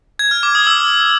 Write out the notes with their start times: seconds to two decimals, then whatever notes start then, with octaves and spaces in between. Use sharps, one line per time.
0.19 G#6
0.31 F6
0.43 D6
0.55 D#6
0.67 E6